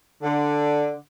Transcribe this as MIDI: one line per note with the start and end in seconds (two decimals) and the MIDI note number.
0.23 0.92 50